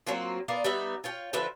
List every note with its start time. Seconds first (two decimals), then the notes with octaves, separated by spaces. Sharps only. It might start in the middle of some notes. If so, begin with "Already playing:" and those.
0.07 F#3 A#3 C4 F4
0.48 B3 F4 A#4 D5
0.64 G3 B3 D#4 E5
1.04 F4 C#5 G5
1.33 D3 F3 B4 E5